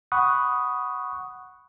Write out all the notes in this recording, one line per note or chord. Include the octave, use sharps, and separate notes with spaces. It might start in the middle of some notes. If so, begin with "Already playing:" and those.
F#5 B5 C#6 D#6 F#6